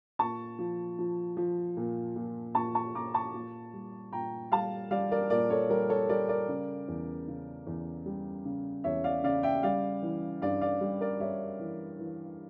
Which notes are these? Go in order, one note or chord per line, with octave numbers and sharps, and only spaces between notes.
A#2 A5 C#6
F3
F3
F3
A#2
A#2
A#2 A5 C#6
A5 C#6
A#2 A#5 D6
A5 C#6
A#2
G3
A#2 G5 A#5
G3 F5 A5
G3 D5 F5
A#4 D5
A#2 A#4 D5
A4 C#5
G3 A#4
A4 C#5
G3 A#4 D5
A#4 D5
C#3
E2
C#3
E2
G3
C#3
E2 C#5 E5
D5 F5
C#3 D5 F5
E5 G5
G3 D5 F5
E3
G2 D5 F5
D5 F5
G3
A#4 D5
G3 C#5 E5
E3
E3